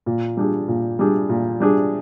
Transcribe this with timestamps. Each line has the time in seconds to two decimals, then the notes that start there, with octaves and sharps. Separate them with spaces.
0.06 A#2
0.37 G3 D4 G#4
0.68 A#2
0.99 G3 D4 G#4
1.29 A#2
1.60 G3 D4 G#4